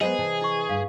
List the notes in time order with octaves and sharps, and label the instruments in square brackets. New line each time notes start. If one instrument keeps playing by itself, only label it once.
[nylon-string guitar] F#3 G#3 B3 [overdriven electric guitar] G#4 [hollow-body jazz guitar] B4 C5 D#5
[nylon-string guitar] C3 E3 A5
[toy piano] E4 C#6
[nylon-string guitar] D2 G2 [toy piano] F5